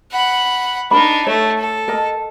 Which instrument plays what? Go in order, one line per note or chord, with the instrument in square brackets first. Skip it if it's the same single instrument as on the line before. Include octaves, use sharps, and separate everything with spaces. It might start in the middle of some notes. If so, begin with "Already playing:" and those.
[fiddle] F#5 B5
[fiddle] D4 D#4 [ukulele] A#4 B5
[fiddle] A3 [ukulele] C#5
[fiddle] A4
[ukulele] A#4 D#5 A5